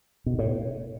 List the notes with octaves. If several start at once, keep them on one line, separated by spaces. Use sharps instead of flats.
B2
A2